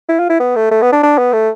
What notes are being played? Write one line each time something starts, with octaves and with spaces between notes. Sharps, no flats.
E4
F4
E4
B3
A3
A3
B3
D4
D4
B3
A3